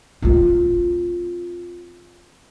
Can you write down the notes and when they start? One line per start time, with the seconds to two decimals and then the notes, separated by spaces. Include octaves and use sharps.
0.22 C4 F4